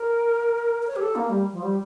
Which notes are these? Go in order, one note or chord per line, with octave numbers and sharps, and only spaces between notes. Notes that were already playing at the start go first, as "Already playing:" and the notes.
Already playing: A#4
A#4
C#5
G4
A4
A#3
G3
F3
G3